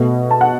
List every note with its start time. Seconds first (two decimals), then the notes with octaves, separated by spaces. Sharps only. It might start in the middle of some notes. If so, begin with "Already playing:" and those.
Already playing: B2 A3
0.31 A5
0.41 F#5